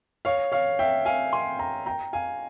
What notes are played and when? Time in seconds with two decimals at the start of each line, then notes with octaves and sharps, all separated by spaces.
0.25 C#5 F5
0.52 C#5 F5
0.79 E5 G5
1.05 F5 G#5
1.33 G#5 C6
1.59 G5 A#5
1.86 G5 A#5
2.13 F5 G#5